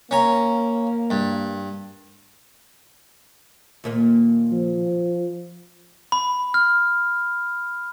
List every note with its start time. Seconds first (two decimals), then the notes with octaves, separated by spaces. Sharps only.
0.11 A#3 C#4 A#5
1.10 G2
3.84 D#2 A#2 A#3
4.52 F3
6.12 B5
6.54 F6